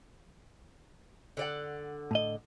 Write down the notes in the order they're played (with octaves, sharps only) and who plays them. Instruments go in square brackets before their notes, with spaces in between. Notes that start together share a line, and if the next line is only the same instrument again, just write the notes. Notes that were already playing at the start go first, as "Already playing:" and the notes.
[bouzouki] D3 D5 F#5
[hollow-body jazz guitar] A2 D#5